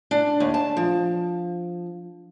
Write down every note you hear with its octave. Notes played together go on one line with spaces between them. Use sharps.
D4
D#2
A5
F3